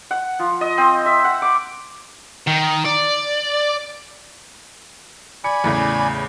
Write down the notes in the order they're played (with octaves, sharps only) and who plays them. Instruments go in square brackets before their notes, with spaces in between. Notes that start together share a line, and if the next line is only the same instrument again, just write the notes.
[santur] F#5
F3
D#5
C4
E5
F#5
D6
[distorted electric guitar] D#3
D5
[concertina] D5 G#5 B5 [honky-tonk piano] C#7
[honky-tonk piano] E2 A2 C#3